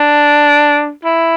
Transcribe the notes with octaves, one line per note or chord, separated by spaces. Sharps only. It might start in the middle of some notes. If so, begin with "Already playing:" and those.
Already playing: D4
E4